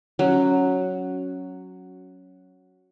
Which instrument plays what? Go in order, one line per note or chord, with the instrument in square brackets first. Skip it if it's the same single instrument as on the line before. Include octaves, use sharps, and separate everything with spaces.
[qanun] F#3 [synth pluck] C#4 F#4 F#5